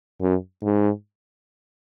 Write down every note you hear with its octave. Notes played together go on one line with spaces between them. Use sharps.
F#2
G#2